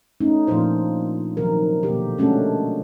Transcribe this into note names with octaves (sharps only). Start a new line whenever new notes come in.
A3 C#4 D#4
A#2 F3 A#3 D4 F4 C5
C3 D#3 F3 F#3 A#4
B2 D3 A#3 G4
G#3 A3 C#4 D4 F#4 A4